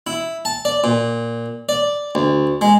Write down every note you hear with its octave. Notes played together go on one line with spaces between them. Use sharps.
E4
A5
D5
A#2
D5
D2
G#3